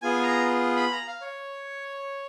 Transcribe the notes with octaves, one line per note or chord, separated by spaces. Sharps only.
B3 F4 G#4 G#5
A#5
B5
A#5
F5
C#5